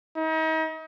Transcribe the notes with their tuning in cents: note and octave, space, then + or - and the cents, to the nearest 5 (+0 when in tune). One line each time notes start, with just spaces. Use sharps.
D#4 +40